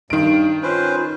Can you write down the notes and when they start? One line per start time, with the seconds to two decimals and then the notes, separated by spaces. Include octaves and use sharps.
0.10 G2 D#3 D7
0.63 C#4 F4 B4 C5